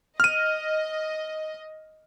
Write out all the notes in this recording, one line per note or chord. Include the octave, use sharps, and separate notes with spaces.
D#5 F6 D#7